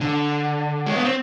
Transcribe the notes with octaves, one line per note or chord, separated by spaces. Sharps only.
D3
G#3
B3
C4